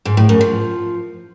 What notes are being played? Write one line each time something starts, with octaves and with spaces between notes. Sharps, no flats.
G#2
A2
F#2
F3